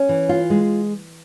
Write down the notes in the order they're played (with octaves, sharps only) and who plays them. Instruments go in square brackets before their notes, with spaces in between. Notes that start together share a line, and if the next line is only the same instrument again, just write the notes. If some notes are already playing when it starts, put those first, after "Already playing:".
Already playing: [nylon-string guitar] C#4
E3
F4
G#3